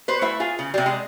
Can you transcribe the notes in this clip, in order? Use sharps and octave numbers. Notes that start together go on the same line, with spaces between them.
B4 C5
A3 E4 E5
F4 G#4
C#3
C3 G3
G#3